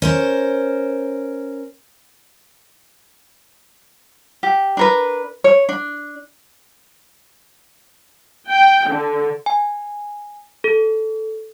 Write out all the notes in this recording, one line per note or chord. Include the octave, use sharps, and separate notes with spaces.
C#4 A#4 C5
G4
D4 A#4 B4
C#5
D4
G5
D3
G#5
A4